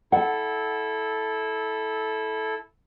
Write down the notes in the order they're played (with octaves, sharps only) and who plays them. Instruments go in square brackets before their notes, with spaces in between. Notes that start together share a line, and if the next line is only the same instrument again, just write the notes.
[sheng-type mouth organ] E4 A4 [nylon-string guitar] F#5